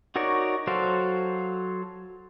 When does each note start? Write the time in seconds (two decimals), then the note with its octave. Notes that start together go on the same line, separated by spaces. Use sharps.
0.16 D#4 F#4 A#4 C#5 D5
0.67 F#3 F#4 A4 C5 F5